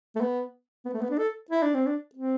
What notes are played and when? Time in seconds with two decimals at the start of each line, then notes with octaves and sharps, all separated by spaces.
0.15 A3
0.21 B3
0.85 B3
0.94 A3
1.01 B3
1.11 D4
1.18 A4
1.50 E4
1.63 D4
1.74 C4
1.86 D4
2.15 C4